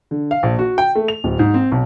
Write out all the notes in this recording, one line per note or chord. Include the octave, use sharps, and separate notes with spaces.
D3
F5
A#1
F#4
G5
A3
F7
D1
G#2
C4
B1